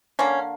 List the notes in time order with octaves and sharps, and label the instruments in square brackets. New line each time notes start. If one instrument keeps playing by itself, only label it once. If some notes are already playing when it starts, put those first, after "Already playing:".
[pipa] D3 A#3 C#4